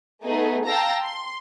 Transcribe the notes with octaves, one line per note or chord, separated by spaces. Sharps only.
A3 B3 D#4 G#4
F5 G5 A5 A#5 E6 A#6
C6